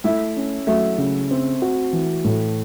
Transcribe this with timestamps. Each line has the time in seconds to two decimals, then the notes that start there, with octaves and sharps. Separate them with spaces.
0.04 A3 E4
0.36 C#4
0.67 F#3 A3
0.98 C#3
1.31 C4
1.62 F#4
1.93 E3
2.25 A2